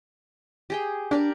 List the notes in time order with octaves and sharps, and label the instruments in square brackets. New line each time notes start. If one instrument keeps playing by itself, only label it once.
[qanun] G4 G#4 G5
[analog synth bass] D4 [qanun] G4 A#4 D5